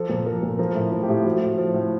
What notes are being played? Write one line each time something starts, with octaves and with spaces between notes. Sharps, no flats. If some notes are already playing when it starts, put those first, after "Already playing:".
Already playing: F3 A4
A#2
F3 A#4
A#2
F3 A#4
A2
F3
G4
A2
F3 F#4
A2
F3
A2